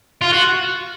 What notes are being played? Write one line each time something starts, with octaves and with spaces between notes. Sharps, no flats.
F4
F#4